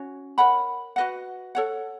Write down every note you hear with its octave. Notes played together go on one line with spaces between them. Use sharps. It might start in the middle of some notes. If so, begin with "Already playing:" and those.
Already playing: C#4 F#4 C#5
A#4 C#5 F#5 B5
F#4 B4 D#5 F#5
A4 C#5 F#5